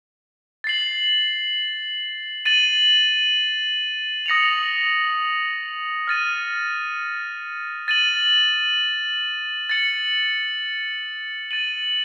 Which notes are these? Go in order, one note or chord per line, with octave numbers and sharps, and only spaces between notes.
A6 C7 F#7
A6 D#7 F#7
D#6 A#6 C#7 F7
F6 A6 D#7
A6 D#7 F#7
A6 C#7 F#7
A6 D#7 F#7